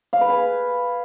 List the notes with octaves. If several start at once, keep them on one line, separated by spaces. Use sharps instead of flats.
F5
B4
G#5